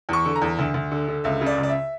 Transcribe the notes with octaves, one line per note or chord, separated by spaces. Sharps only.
E2 C#6
D3
A#5
E2
D2
D2
D3
D3
C#2 E5
C#3
D5
C#2
D5
E5